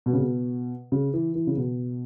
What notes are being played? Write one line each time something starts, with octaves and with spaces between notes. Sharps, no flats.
B2
C#3
B2
C#3
E3
E3
C#3
B2